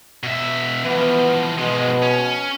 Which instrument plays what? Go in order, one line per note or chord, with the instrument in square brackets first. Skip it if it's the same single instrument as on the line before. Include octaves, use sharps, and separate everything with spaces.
[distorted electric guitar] B2 E5
[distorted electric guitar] E3 F3 [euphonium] B3
[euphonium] B2 [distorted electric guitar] F3 G#3
[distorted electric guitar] C#4